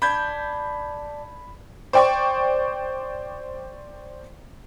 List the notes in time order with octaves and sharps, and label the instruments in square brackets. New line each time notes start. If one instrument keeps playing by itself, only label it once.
[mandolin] D4 [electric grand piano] B5 G6 G#6
[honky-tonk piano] C5 D5 G5 C6 C#6